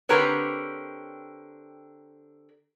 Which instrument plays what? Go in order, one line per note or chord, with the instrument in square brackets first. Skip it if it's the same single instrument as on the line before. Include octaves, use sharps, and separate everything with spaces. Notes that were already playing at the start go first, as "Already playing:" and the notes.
[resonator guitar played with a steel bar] D3 C4 G4 A#4 B4 C#5